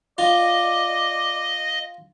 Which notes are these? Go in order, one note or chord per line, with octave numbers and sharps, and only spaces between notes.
F4 D5 D#5